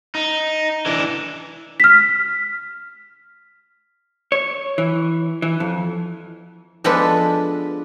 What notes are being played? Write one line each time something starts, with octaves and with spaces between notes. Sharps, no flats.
D#4
E3 D4
F6 B6
C#5
E3
E3
F2
F3 G#3 B3 D4 A4 B4